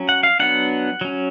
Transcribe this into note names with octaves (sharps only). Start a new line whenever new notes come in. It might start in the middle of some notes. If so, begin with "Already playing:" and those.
Already playing: F#3 C#4
F#5
F5
F#3 B3 D4 F#5
F#3 C#4